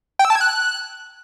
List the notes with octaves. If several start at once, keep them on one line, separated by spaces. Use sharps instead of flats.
G5
E6
A5
G#6
F#6